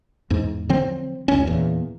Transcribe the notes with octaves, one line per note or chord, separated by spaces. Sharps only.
E2 G#2
D3 F3 F#3 C4
F1 C#2 C#4
E2 A#2